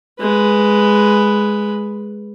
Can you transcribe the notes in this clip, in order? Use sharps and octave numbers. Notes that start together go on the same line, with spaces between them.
G#3 B4